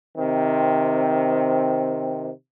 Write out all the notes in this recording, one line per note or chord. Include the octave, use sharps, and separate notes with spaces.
C3 D#3 C4